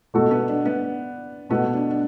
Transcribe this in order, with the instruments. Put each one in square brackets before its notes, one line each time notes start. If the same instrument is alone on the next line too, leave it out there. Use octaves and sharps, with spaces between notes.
[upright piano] B2 A3 F#4 A4
[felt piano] B3
D4
B3
[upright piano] B2 A3 F#4 A4 [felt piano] B3
[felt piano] D4
D4